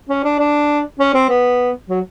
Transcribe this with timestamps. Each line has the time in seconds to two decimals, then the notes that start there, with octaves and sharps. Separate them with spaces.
0.09 C#4
0.24 D4
0.39 D4
0.99 C#4
1.14 C4
1.29 B3
1.89 F#3